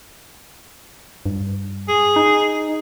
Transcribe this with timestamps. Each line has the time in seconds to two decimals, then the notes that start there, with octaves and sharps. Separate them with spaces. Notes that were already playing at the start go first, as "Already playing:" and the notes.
1.26 G2
1.89 G#4
2.16 D#4